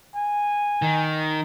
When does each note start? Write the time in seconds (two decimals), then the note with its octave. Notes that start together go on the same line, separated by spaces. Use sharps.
0.15 G#5
0.82 D#3